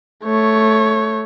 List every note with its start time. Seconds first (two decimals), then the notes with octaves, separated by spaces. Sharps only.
0.25 A3 C#5